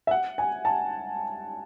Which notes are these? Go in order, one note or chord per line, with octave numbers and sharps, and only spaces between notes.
E5
F#5
G#5
A5